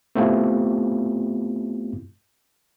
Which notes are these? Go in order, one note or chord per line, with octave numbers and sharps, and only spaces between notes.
A3 B3 C4 E4 F4 G4